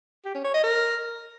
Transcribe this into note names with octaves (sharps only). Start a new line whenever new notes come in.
G4
C#4
C#5
D#5
A#4